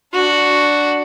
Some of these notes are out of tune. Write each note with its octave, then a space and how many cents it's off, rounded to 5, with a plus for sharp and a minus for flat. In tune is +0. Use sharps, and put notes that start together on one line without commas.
D4 +0 F#4 +0